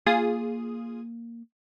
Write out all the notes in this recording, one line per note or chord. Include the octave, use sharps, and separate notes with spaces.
A#3 F4 G#4 D#6